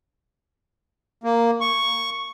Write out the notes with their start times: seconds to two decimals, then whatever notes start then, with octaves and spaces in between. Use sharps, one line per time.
1.24 A#3
1.61 C#6